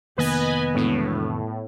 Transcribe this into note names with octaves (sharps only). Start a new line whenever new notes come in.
F1 D#3 A#3 B3 B4 D#5 G#5
E1 A2